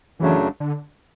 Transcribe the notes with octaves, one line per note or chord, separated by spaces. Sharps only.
F#2 C#3 E3 F#3 A3 D4
D3